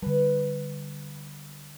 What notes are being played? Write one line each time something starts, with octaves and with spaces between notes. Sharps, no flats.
D3 G3 B4